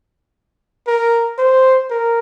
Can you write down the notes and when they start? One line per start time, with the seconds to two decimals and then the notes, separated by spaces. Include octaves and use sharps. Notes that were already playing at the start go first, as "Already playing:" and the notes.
0.87 A#4
1.38 C5
1.90 A#4